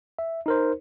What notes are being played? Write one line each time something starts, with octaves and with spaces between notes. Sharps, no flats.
E5
D#4 A#4 C5